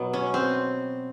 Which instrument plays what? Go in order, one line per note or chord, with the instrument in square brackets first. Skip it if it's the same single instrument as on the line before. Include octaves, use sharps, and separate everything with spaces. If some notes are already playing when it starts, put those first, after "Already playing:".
Already playing: [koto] B2 F#3 B3
C#4
C4